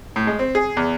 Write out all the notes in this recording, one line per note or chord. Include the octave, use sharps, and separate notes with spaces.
A2
G#3
C4
G#4
E2